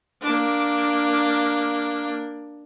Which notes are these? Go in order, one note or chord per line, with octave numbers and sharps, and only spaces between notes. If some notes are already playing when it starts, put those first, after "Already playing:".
A#3 D4